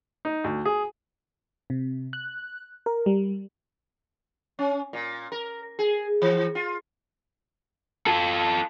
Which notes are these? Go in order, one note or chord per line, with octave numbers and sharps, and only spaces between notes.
D#4
D2
G#4
C3
F#6
A#4
G3
C#4
A#2
A#4
G#4
E3
F4
F4 A4